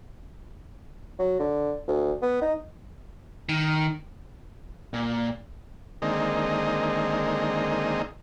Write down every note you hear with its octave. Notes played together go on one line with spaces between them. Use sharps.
F#3
D3
D2
B3
D#4
D#3
A#2
D3 D#3 G#3 A#3 C4 D#4